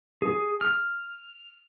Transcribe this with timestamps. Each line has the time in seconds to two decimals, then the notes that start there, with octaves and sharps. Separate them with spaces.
0.22 G#4
0.61 F6